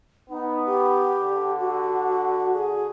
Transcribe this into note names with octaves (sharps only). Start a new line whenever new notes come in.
B3 D#4
G4
D3
F#4
G#4